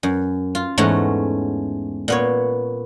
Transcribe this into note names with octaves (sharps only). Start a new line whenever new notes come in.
F#2
F4
E2 G#2 A3 C#4 F#5 A#5
A#2 B3 C#5